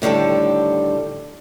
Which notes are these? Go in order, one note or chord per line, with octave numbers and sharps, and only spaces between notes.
A2 D3 D#3 G3 A4